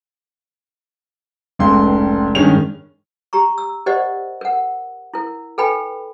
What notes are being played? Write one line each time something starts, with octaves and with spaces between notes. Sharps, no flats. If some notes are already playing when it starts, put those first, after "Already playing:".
F1 C#2 C6
G2 D#3 G#3 C#4 F7
G4 A#5 C#6
E6
G4 A#4 C5 D5 D#5 F#5
A#4 F#5
E4 A#4
A4 B4 G5 G#5 B5